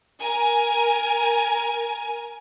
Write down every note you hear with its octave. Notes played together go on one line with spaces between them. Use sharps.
A#4 G#5